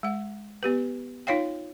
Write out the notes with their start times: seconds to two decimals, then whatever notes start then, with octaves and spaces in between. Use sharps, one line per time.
0.03 G#3 F#5
0.63 B3 G4 B4
1.27 D#4 F4 C#5 F5 G5